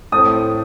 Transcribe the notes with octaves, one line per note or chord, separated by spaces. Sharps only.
A2 A3 C4 D#6